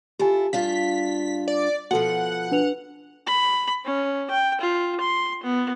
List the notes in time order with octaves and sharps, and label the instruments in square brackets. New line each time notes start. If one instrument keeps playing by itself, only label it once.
[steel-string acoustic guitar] E4 F4 A4 [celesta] G4 G#5
[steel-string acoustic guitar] G2 D4 F4 [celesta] F5 [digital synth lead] B6
[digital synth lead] D5
[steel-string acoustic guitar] B2 F3 [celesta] F#4 A4 [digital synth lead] F#5
[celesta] D4 B4 F7
[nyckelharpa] B5
C#4
G5
F4
C6
B3